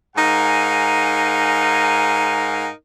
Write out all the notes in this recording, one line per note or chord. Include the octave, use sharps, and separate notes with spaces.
G#2 D#4 A#4 F5 F#5 G#5